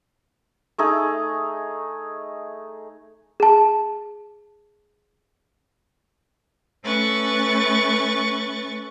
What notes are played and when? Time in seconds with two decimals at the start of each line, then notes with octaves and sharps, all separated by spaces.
0.78 A3 D#4 G#4
3.40 G#4 A5
6.84 A3 C#4 B4 C#6 A6